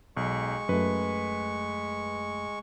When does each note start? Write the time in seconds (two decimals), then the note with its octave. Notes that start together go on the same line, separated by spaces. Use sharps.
0.17 B1 G#3 C#6
0.69 F#2 A3 B4